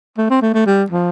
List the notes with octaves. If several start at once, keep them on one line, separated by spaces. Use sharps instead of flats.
A3
C4
A3
A3
G3
F3